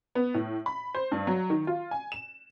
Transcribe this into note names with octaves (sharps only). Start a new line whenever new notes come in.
B3
A2
B5
C5
G2
F#3
D#3
F4
G#5
E7